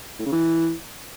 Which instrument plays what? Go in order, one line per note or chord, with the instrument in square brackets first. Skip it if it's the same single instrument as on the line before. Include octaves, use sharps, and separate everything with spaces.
[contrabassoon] A2
C#3
E3